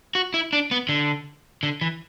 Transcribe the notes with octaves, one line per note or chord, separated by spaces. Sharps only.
F#4
E4
D4
B3
D3
D3
E3